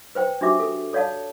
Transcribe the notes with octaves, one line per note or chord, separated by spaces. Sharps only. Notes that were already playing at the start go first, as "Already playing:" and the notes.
B4 C5 G5
D4 F#4 G4 E5 D6
A4
A4 C#5 D5 F5 A5